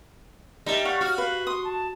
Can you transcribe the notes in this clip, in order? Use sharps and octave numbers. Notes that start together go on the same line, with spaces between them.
G3 D#4 E5 A5
C#5 F5 F#5 C#6
F#4 F6
B4 F5
C6 D#6
A5